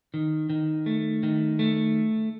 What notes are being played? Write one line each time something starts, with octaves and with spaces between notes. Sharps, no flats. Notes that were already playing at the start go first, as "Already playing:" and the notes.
D#3
D#3
A3
D#3
A3